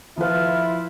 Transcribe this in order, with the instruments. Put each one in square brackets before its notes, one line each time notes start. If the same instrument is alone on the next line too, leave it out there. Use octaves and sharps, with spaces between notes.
[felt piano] F3 B4 [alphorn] E4 [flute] F4